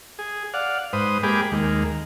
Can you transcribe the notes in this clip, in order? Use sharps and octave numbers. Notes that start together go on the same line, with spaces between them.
G#4
D5 F5 F#5
G#2 B4 C5 D#6
G#3 A#3 G4 G#4 B5 D6
D#2 G#3 A#3